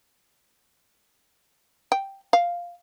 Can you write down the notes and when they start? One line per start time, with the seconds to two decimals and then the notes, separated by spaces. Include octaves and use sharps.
1.92 G5
2.33 F5